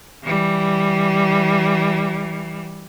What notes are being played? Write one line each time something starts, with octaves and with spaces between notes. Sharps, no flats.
E3 G3